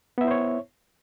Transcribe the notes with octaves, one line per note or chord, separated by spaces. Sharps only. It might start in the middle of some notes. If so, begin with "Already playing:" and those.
B3 E4 C5 C#5 E5